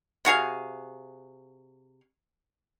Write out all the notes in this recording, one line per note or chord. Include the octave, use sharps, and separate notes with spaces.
C3 F#4 G#4 F5